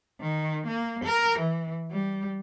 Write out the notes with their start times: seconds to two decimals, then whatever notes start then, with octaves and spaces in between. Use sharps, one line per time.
0.20 D#3
0.67 A#3
1.04 A#4
1.39 E3
1.91 G3